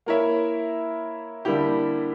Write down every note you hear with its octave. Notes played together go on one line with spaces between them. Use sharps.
A#3 E4 A#4 C#5 E5
D3 G3 A#3 E4 G4